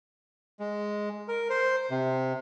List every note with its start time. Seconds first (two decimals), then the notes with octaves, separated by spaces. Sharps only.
0.60 G#3
1.28 A#4
1.50 C5
1.90 C3